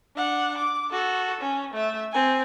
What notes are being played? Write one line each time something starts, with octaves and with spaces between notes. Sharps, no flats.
D4 F#5
D6
F#4 A4
C#4
A3 E5
C4 G#5